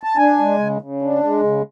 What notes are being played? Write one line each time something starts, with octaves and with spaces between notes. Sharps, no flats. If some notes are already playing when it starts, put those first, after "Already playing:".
A5
D4 G#5
G#3
C#3
C#3
D4
G#3
C#3